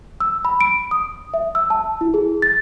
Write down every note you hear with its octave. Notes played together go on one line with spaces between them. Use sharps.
E6
B5
D7
D#6
E5
E6
A5
E4
G#4
A6